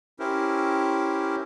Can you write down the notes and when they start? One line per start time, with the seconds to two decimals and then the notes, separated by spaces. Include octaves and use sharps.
0.19 C#4 E4 G4 A#4 C5